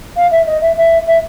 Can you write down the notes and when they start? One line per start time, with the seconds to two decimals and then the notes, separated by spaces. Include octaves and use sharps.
0.16 F5
0.31 E5
0.47 D#5
0.61 E5
0.77 E5
1.07 E5